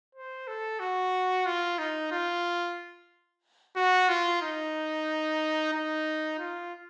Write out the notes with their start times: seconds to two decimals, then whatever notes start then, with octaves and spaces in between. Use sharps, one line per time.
0.15 C5
0.47 A4
0.80 F#4
1.46 F4
1.79 D#4
2.12 F4
3.76 F#4
4.09 F4
4.42 D#4
5.73 D#4
6.39 F4